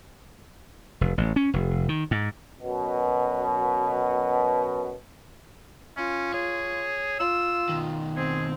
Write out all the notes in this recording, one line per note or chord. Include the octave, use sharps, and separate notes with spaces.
F1
A1
C#4
F1
D#3
G#2
F#2 B2
C#4 F4
G#4 C#5
F4 E6
B2 D#3
C4 G#4